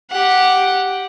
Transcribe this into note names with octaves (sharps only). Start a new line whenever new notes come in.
G4 F#5